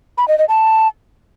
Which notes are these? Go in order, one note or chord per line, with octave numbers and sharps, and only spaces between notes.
B5
D#5
D#5
A5